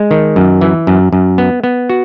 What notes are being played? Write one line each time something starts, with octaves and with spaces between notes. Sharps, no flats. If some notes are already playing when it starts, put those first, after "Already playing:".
Already playing: G#3
D#3
F#2
E3
F#2
F#2
B3
B3
F#4